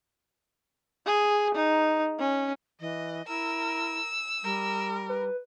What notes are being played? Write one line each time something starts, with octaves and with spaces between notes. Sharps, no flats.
G#4
D#4
C#4
E3 D#5
E4 A#4 E6
G3 A#4
B4